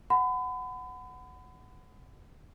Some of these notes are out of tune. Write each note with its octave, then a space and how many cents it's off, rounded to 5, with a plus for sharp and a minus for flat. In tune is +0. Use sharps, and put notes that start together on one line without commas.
F#5 +0 B5 +35